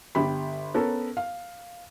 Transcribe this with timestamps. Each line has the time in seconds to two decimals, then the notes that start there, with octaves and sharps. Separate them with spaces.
0.15 G1 G4 B5
0.74 B3 C#4 A4 A#4
1.17 F5